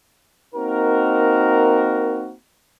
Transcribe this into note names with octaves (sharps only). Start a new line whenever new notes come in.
A#3 C4 D#4 F#4 A#4